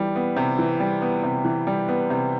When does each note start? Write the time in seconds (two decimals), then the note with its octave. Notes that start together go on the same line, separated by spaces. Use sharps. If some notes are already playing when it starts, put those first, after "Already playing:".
Already playing: E3 G3
0.16 B3
0.36 C3
0.59 E3
0.80 G3
1.02 B3
1.24 C3
1.45 E3
1.67 G3
1.88 B3
2.10 C3